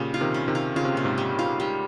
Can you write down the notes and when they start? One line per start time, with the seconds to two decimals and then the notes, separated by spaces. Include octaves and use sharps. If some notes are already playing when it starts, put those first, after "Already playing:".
Already playing: A#2 C#3 G3
0.14 F4
0.21 C3 D#3
0.34 C#4
0.48 C3 D#3
0.55 F4
0.76 C#3 F4
0.85 C3
0.95 A#2 C#4
1.04 G#2 C3
1.18 G3
1.39 F4
1.60 G3